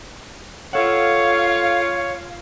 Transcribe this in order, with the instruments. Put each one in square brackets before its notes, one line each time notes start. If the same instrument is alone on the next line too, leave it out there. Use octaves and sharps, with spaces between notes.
[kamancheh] F4 F5 [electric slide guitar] A4 F#5 [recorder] C#5